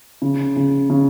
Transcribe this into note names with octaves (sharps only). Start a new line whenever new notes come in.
C#3
C#3
C#3